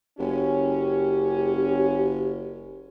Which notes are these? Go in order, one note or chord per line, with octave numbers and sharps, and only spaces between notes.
F#1 C#4 G4